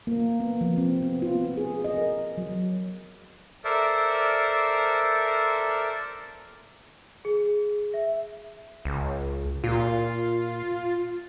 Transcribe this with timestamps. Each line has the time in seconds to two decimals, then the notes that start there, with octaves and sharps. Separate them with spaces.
0.07 A#3
0.40 B3
0.61 F3
0.78 C4
1.03 B3
1.22 F4
1.35 B3
1.57 G#4
1.84 D#5
1.97 A#4
2.38 F#3
3.64 A4 A#4 C5 D5 E5
7.25 G#4
7.94 E5
8.85 C#2
9.64 A#2 F4